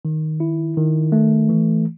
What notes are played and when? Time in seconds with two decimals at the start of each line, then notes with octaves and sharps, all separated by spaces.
0.05 D#3
0.40 E4
0.77 D#3
1.12 A3
1.49 E3